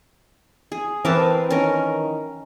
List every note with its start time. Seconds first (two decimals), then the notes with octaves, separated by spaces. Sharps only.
0.72 G#4
1.05 E3 C4 A#4 B4 A5
1.51 D#3 C#4 A#4